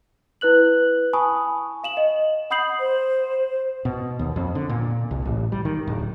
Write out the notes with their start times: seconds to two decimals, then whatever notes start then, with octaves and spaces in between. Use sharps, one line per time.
0.41 E4 B4 F#6 F#7
1.13 G#5 A5 B5 C#6 D#6
1.84 F5 E7 F#7
1.97 D#5
2.51 F#5 B5 D#6 G6 C7 F#7
2.80 C5
3.85 B2
4.19 D#2
4.36 F2
4.55 D3
4.69 A#2
5.11 C2
5.25 A1
5.52 G3
5.65 D#3
5.87 D1